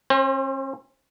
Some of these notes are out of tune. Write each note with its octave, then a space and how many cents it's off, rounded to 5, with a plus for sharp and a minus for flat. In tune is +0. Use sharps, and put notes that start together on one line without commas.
C#4 -45 C5 +25